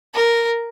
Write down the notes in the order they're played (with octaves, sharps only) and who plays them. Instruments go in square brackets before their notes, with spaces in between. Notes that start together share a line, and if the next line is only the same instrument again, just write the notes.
[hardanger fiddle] A#4